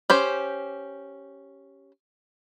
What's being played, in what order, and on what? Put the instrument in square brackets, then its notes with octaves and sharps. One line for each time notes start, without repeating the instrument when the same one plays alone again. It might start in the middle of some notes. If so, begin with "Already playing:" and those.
[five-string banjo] C#4 G4 C5